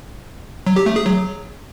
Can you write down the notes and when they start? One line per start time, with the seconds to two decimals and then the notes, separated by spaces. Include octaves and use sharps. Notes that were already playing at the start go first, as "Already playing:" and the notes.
0.67 F#3
0.76 G4
0.86 A3
0.96 G#4
1.06 F#3